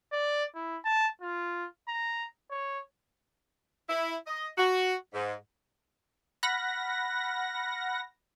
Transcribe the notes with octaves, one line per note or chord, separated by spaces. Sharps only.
D5
E4
A5
F4
A#5
C#5
E4
D#5
F#4
G#2
F#5 B5 F6 F#6 A#6